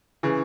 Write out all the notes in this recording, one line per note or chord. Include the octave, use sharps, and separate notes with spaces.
C#3 E3